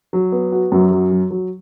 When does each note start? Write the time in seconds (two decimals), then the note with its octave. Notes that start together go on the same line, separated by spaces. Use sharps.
0.13 F#3
0.32 B3
0.52 F#4
0.72 F#2 F#3
0.91 F#3
1.11 F#3
1.31 F#3